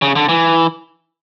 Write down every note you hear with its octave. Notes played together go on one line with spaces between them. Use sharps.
C#3
D3
E3